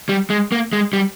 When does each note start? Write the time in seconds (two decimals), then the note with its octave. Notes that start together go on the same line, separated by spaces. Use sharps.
0.09 G3
0.30 G#3
0.52 A#3
0.73 G#3
0.93 G3